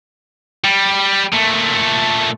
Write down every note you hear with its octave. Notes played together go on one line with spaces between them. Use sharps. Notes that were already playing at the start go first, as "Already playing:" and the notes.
G3
A#2 A3